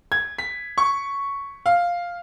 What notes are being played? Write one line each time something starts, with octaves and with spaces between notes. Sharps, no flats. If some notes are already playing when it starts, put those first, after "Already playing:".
G#6
B6
C#6
F5